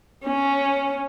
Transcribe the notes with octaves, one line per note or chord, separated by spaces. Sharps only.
C#4